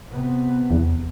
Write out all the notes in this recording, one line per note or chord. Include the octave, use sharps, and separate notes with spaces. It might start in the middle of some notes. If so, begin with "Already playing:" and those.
C3 B3
E2